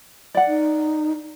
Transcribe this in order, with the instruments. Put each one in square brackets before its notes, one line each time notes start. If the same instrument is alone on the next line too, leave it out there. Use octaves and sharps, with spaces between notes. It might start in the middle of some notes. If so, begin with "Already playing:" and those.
[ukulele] D5 F#5
[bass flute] D#4